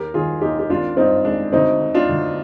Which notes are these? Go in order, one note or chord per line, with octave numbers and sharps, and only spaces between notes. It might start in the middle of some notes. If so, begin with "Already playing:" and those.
Already playing: D#2 G4 A#4
D#3 F4 G#4
D#2 D#4 G4
G4
G#1 D4 F4
G2 C4 D#4
G#3 D4
D2 C4 D#4
D3
D4 F4
D2